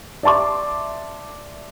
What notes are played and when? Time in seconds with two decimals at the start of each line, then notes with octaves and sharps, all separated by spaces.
0.23 D5 E5 A5 C6 D6